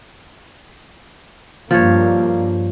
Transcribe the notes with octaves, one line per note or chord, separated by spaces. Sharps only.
G2 F3 A#3 C#5